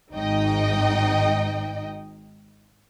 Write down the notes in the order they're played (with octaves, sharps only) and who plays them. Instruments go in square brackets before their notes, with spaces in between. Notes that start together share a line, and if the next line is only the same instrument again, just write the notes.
[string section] G#1 G#2 D#4 D#5 G5